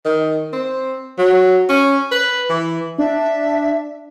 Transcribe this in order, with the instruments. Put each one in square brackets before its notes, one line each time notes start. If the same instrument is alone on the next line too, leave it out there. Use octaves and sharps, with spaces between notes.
[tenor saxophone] D#3
C4
F#3
C#4
B4
E3
[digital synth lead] D4 [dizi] E5